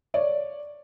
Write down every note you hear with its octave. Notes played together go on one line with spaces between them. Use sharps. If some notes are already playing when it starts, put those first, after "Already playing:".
C#5 D5